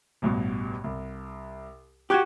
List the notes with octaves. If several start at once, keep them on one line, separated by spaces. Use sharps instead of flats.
A1 G2 B2
C2
F#4 G4 C#6 F#6 G#6